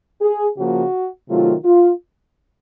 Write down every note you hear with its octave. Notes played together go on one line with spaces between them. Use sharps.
G#4
C#3 F3 A#3 F#4
C3 D#3 F#3 A3 F4
F4